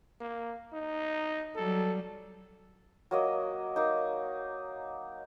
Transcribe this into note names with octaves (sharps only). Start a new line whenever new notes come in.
A#3
D#4
F#3 G3 A4
F#3 A#3 D#5
A#3 D#4